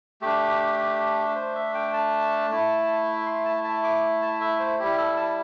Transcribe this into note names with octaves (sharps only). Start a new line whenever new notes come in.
A3 D4 G4
C5
E5
G5
A5
A3 E4
C6
A5
A5
D6
A5
E5
C5
G3 E4 G4
A4
A5